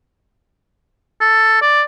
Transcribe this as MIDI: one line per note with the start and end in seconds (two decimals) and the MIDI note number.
1.21 1.57 69
1.62 1.82 74